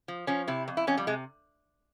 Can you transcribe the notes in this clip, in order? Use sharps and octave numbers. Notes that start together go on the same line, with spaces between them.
F3
F3 C#4
C3 E4
F2
E4
F2 C#4
G3
C3 G#3